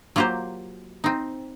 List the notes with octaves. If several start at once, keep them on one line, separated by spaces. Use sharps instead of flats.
F#3 A#3 F4 G4 C5
C4 D#4